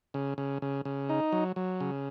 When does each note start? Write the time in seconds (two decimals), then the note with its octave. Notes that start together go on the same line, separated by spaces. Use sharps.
0.14 C#3
0.38 C#3
0.62 C#3
0.85 C#3
1.09 D#4
1.32 F#3
1.56 F#3
1.80 C#3